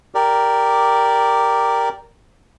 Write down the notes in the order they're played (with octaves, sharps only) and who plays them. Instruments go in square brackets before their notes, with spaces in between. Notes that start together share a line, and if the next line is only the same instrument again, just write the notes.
[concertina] G4 A#4 D5